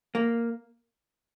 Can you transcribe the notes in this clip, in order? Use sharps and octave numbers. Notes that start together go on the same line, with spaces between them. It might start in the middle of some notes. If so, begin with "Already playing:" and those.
A#3